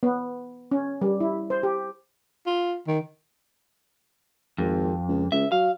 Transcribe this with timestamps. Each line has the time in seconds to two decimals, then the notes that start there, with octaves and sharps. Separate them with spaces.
0.03 B3
0.71 C#4
1.01 G3
1.20 E4
1.50 C5
1.63 G4
2.46 F4
2.87 D#3
4.58 G#1 F2
5.08 C#2
5.32 C#2 E5
5.52 F#3 F5